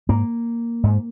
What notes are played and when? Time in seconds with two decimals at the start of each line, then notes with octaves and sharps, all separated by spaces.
0.09 G#2 A#3
0.84 G#2